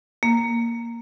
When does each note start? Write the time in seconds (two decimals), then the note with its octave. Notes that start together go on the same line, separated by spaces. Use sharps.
0.23 A#3